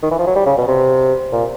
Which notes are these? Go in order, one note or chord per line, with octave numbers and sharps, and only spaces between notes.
D#3
E3
F3
F#3
G3
C#3
B2
C3
A#2